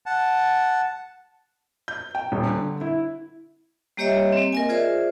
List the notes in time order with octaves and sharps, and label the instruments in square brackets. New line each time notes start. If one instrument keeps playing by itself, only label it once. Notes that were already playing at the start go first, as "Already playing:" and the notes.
[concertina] F#5 A5
[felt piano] G6
G5
D#1
D3
E4
[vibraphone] G3 A#3 G4 C#5 D#5 E5
A#3 C4
A#4 D#5 G#5
F4 G#4 C5 D5 E5